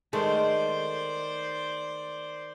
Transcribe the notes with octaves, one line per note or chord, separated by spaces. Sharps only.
D#3 G#3 A3 C5 D5